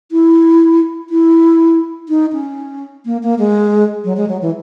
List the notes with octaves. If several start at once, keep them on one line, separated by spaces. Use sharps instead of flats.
E4
E4
D#4
C#4
A#3
A#3
G#3
F#3
G#3
F#3
E3